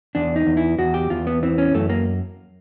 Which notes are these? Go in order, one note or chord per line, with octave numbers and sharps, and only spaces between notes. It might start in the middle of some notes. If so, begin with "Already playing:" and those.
E2 D4
D#4
E2
E4
E2 F#4
G4
E2 F4
B3
E3 C4
C#4
F#2 A3
A#3